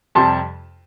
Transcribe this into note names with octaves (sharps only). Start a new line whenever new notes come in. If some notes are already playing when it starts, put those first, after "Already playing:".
F2 C3 G3 A5 C6